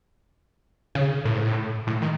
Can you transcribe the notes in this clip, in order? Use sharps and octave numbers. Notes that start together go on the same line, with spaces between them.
C#3
A2
G#2
A2
A2
D#3